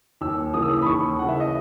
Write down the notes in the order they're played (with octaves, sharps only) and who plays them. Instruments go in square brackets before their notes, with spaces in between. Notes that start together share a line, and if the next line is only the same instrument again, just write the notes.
[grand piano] D#2 E6
C#3 E3 A#3 D#6
E6
D#6
B5
D#2 C#6
C#3 E3 A#3 F#5
E5
D#5